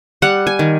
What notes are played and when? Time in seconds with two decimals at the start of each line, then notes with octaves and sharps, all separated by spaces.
0.22 G3 F#5
0.47 G#5
0.59 D#3